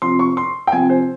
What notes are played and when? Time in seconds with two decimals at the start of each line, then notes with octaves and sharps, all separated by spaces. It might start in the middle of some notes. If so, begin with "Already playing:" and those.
0.02 C3 F3 C6
0.19 C#6
0.37 C6
0.67 G5
0.72 C3 F3 G#5
0.90 C5